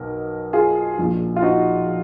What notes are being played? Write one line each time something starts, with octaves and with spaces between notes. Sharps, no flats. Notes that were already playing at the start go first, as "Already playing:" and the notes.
Already playing: B1 B2 A#4
F4 G#4
A#1 A#2
F4
D#4 F#4